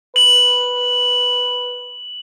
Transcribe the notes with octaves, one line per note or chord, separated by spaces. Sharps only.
B4 F#7